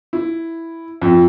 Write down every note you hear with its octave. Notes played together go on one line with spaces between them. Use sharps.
E4
F2